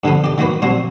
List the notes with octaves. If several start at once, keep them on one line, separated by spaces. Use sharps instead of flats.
G2 D3 F3 B3
G4 D5
D#3 F#3 A#3 F#4 B4
A#2 F3 G3 C4 F#4